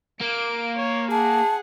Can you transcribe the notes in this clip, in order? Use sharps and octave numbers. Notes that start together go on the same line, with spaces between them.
A#3 D7
C#5
G#4 F#5 A5